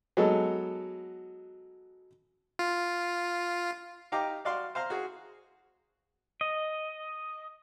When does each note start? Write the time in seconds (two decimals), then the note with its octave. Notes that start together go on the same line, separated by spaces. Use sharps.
0.17 F#3 G#3 B3 D#4 A4
2.59 F4
4.12 D#4 G4 F5 G5 A#5 D6
4.45 F#4 D5 F5 C6
4.75 C5 F5 A#5 C6
4.90 F#4 G#4
6.41 D#5